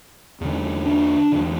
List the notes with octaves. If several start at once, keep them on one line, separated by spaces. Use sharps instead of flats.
E2 D3
D4
E2 D3